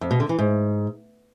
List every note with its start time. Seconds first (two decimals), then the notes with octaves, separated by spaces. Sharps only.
0.01 F2
0.11 B2
0.20 D3
0.29 E3
0.39 G#2